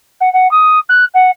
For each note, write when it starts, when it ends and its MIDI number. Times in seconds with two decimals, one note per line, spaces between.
0.21 0.32 78
0.33 0.50 78
0.51 0.79 87
0.89 1.05 90
1.14 1.31 78